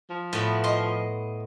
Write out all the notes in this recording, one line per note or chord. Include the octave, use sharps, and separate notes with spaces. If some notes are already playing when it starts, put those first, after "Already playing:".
F3
A2 B3 B4
D#5 C6